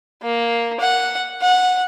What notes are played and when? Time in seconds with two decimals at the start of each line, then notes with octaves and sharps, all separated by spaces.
0.23 A#3
0.80 F#5
1.42 F#5